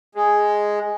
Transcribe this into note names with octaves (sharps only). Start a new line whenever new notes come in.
G#3